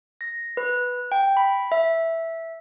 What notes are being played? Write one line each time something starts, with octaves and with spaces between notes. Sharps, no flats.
A#6
B4
G5
B5
E5